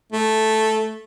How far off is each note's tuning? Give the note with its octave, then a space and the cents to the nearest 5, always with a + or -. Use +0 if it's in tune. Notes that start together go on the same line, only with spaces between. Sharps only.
A3 -5